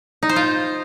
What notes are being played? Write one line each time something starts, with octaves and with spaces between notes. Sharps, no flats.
D#4
C5
F4